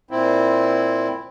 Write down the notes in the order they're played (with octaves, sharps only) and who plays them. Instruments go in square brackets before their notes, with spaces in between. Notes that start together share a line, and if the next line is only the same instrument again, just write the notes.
[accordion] A#2 C4 E4